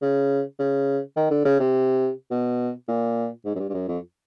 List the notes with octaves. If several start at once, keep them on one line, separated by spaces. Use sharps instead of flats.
C#3
C#3
D#3
D3
C#3
C3
B2
A#2
G#2
F#2
G2
G2
F#2
F2